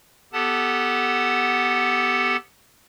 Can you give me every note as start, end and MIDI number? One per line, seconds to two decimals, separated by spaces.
0.33 2.36 59
0.33 2.36 67
0.33 2.36 69
0.33 2.36 78
0.33 2.36 81